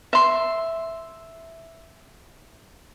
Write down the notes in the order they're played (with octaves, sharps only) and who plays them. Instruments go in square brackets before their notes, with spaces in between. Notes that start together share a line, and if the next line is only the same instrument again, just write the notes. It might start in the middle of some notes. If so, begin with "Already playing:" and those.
[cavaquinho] E5 C6